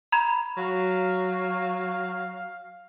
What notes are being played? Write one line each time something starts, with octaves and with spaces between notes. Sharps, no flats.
A#5 B5 G#6
F#3 F5